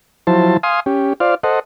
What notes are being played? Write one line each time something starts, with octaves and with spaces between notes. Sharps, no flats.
F3 F#3 E4 C5 A5
F5 G#5 C6 D#6
C#4 G4
F4 C5 D5 F5
A4 C5 D#5 F#5